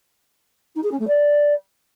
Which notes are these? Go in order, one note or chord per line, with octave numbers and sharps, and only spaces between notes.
D#4
G#4
C#4
A3
D5